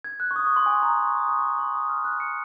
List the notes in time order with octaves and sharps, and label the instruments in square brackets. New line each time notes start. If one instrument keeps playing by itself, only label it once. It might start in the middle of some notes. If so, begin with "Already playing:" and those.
[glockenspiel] G#6
F#6
C#6
D#6
C#6
C6
G#5
A#5
C6
C#6
D#6
C6
C#6
A#5
C6
D#6
F6
F#6
C#7